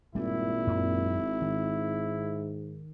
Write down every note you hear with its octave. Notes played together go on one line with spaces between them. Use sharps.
G#1 G2 A#2 G3 E4
F#2 C4
G#2 D#3